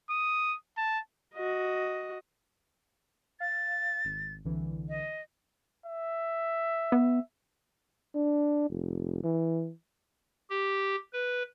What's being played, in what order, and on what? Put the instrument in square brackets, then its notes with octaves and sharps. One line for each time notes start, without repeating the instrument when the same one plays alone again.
[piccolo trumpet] D#6
A5
[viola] F#4 D#5
[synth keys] F5 [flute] A6
[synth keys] G#1
C2 D3 E3
[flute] D#5
[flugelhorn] E5
[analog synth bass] B3
[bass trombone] D4
F1
E3
[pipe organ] G4
B4